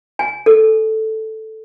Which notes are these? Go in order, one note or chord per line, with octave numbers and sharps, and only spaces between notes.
G#5
A4